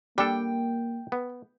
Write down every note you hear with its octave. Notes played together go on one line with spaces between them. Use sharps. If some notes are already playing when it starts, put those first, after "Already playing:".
G3 A#3 D4 A4 G5
B3